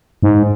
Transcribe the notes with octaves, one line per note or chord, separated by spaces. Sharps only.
G#2